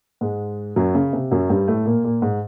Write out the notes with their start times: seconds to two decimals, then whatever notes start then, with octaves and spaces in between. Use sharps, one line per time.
0.21 G#2 G#3
0.76 F#2 F#3
0.95 C#3
1.13 C3
1.31 F#2 F#3
1.50 G2 G3
1.68 A2 A3
1.86 A#2 A#3
2.04 A#2 A#3
2.22 G#2 G#3